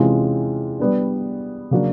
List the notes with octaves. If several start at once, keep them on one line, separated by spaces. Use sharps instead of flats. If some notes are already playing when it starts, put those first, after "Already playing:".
Already playing: C3 E3 G#3 C#4 F4
G3 B3 D4
C#3 F#3 A#3 D4 F#4